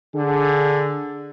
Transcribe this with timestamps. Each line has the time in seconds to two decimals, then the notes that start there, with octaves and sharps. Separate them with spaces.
0.15 D3 G#4